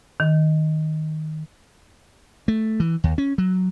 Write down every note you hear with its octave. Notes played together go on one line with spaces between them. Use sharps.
D#3
A3
E3
D#2
C#4
F#3